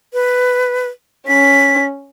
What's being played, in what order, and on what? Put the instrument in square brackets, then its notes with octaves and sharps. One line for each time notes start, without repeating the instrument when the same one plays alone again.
[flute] B4
[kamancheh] C#4 [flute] B6